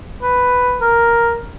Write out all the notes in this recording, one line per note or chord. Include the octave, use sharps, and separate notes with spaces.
B4
A#4